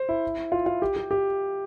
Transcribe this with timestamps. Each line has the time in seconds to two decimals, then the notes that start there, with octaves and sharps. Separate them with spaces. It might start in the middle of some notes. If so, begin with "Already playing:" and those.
Already playing: C5
0.09 E4
0.52 F4
0.66 F4
0.82 G4
0.96 G4
1.11 G4